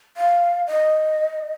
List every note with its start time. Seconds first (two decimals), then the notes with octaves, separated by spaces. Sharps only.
0.17 F5
0.67 D#5